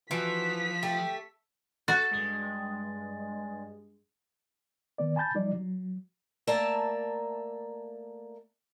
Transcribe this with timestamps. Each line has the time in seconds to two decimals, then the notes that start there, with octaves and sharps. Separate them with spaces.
0.11 E3 F3 F#4 B6
0.83 A3 G4
1.88 F#4 A4 A6
2.11 G2 G#3
4.98 D#3 B3 D5
5.16 G#5 A5 B5 G6 A6
5.35 F3 G3 D#4 D5
5.54 F#3
6.47 A3 A#3 D5 E5 A5 A#5